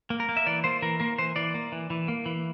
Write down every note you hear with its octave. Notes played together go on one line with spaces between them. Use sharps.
A#3
A#4
A#3
E5
E3 D5
A#3 C5
E3 A#4
A#3 A#4
E3 C5
E3 D5
A#3
E3
E3
A#3
E3